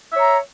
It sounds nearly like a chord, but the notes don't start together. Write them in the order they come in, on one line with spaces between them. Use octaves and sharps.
E5 C#5 A#5